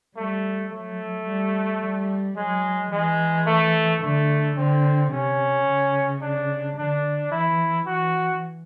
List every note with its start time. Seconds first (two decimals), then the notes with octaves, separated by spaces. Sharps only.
0.16 G3 A3
0.72 F#3 A3
1.27 G3
1.82 G3
2.36 F#3 G#3
2.92 E3 G#3
3.46 A3
4.02 D3 A3
4.57 D3 C4
5.12 C3 C#4
5.67 C#3
6.22 D4
6.77 D3 D4
7.32 E3 E4
7.86 E3 F#4